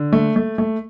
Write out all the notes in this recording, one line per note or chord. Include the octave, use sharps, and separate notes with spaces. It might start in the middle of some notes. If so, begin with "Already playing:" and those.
Already playing: D3
A3
A3
A3